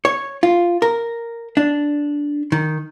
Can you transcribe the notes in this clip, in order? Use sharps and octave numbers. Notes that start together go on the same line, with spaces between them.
C#5
F4
A#4
D4
D#3